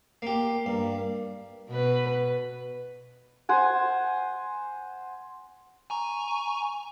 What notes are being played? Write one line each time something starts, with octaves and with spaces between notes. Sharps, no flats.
A#3 G4
G2 A#3
B2 B4
C5 F#5 G#5
G#5 A#5 C#6